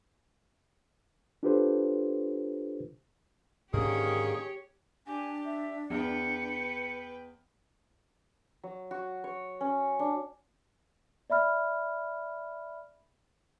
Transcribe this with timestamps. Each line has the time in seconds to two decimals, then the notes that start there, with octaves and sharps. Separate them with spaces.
1.43 D4 F4 G4 A4 B4 C5
3.73 G#2 D3 D#3 A#3 C#4 G4 G#4 C#5
5.07 D4 G4 G#5
5.45 E5
5.90 E2 B4 G5 C#7
8.63 F#3
8.91 F#4
9.24 C#5
9.61 C#4
9.99 D4
11.30 D5 E5 B5 F6